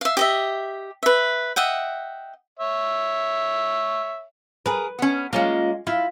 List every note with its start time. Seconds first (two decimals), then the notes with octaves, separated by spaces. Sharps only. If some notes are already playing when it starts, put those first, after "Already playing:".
0.01 E5 F5
0.17 G4 D#5 E5
1.03 B4 E5
1.56 D#5 E5 F#5 G5
2.59 C#5 E5
4.66 G#4 A#4 B4
4.99 B3 C#4
5.33 G#3 A#3 C#4 F4
5.87 E4 F4